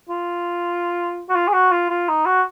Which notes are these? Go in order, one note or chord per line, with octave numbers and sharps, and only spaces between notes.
F4
F#4
F4
G#4
F#4
F4
F4
D#4
F#4